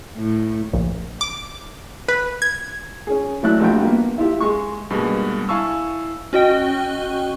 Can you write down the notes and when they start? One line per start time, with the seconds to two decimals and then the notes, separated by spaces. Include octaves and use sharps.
0.17 A2
0.73 A#1
1.21 D6
2.08 B4
2.42 G#6
3.07 C#4 G#4
3.43 F#3 A3 E4 D5 F#6
3.60 A#1 G2 A3 F4 F#4 G5
3.85 A#3 B3
4.18 E4 F4 G4 E5
4.40 G#3 C#6
4.90 G2 B2 G3 G#3 A#3 B3
5.49 E4 F5 G#5 A5 C#6 E6
6.33 C#4 F#4 D#5 G5